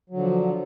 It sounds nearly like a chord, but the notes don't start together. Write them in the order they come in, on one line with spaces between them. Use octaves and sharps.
F#3 D3 F3